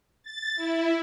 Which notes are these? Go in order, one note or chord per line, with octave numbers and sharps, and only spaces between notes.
A6
E4